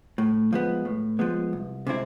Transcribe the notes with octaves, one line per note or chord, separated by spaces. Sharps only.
A2
F3 G#3 B3
A2
F3 G#3 B3
C2
C3 G#3 C4 E4